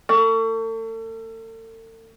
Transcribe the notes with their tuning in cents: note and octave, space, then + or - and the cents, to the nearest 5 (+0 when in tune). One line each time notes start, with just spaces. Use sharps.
A3 +40